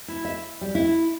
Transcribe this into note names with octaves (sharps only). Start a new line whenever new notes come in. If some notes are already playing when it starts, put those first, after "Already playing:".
E4
E5
G3
E4